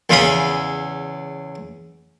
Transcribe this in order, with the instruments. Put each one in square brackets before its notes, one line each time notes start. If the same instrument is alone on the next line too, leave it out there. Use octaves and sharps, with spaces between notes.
[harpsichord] E2 C#3 F5 B5 D#6